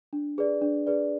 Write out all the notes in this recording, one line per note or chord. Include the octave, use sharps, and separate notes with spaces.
D4
G#4 B4 D5
D4
G#4 B4 D5